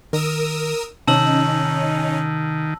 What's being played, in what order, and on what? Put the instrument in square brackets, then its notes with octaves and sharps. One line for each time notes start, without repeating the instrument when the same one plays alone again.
[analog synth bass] D#3 [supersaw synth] A#4 D#6 E6
[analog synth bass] C3 [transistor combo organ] D#3 [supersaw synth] C#4 D#4 [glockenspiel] A5 E6 F#7